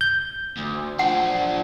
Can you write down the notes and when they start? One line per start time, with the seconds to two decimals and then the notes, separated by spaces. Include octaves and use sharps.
0.01 G6
0.58 D2
0.99 F3 D4 F#5